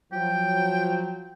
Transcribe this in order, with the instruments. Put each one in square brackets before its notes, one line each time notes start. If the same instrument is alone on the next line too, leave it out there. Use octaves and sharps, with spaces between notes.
[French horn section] F3 F#3 [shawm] G5